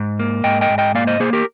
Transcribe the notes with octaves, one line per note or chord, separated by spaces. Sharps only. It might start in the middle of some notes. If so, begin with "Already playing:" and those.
Already playing: G#2
A#3
G#2 D#5 G5
D#5 G5
G#2
D#5 G5
A#3 D5 F5
C5 D#5
A#3 G#4 C5
G4 A#4